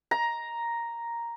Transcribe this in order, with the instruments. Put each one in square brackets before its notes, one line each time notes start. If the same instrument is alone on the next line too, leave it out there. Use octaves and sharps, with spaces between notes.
[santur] A#5